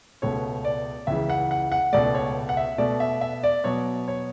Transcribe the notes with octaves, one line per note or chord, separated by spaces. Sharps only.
C#2 B2 A3 C#5
D5
C#2 C#3 E3 E5
F#5
F#5
F#5
C#2 B2 A3 D5
C#5
F#5
E5
B2 A3 D5
E5
E5
D5
B2 F#3 B3 C#5
C#5